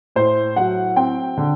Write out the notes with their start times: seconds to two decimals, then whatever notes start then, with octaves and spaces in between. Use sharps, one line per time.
0.16 A2 C5
0.56 F#3 F#5
0.96 C4 G5
1.38 D3